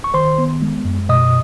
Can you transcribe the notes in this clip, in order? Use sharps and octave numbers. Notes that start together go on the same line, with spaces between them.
C#6
D#3 C5 C6
B3
G#3
F#2
B2 D#5 D#6